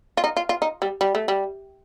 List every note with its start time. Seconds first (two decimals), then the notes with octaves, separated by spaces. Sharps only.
0.17 F4
0.24 D#4
0.37 F4
0.49 F4
0.62 D#4
0.82 G3
1.01 G3
1.15 A3
1.28 G3